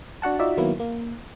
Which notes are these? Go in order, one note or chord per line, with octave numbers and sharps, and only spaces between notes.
D4 F#4 F#5 A5
D#4 F4 F#4 D5 E5
D#3 F#3 A#3 B3 E4
A#3